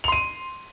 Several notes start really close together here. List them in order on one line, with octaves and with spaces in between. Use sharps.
F7 C6 D#7